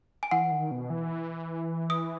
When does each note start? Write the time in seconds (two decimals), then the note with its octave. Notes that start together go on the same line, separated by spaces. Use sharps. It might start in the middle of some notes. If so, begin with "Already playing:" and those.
0.23 G#5
0.31 E3 F#5
0.51 D#3
0.71 B2
0.90 E3
1.90 D#6